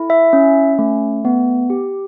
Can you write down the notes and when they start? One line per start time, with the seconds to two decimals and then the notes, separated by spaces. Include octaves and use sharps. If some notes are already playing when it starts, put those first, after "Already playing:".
Already playing: E4 A4
0.10 E5
0.33 C#4
0.79 A3
1.25 B3
1.70 G4